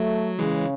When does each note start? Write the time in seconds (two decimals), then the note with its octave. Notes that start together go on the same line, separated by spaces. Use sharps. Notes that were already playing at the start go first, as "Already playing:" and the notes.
Already playing: F#3 A3
0.39 C#3 E3 G#3